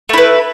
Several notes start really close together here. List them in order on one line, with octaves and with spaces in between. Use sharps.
A3 E4 B4